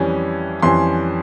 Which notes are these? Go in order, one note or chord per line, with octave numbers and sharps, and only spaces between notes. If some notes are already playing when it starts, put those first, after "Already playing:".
Already playing: F2 E3 G3 C#4
F2 E3 G3 C#4 C6